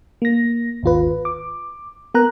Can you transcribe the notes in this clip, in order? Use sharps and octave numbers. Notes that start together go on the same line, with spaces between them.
A#3 A#6
G#1 D#2 F4 B4
D6
B3 A#4 A#5 F#6